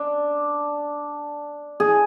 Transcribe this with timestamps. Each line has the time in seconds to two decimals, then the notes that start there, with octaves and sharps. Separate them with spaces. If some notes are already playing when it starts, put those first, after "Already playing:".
Already playing: D4
1.80 G#4